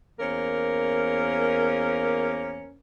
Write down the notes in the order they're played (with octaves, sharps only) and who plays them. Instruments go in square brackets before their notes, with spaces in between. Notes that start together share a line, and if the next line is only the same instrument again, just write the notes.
[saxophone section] E2 A#3 C#4 A#4 C5